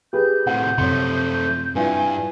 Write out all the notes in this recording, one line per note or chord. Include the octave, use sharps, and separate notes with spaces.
G4 G#4 B4 G6
A2 C3 F#5
F#2 C3 F3 A3 C#5 C6
G2 E4 F4 B4 G#5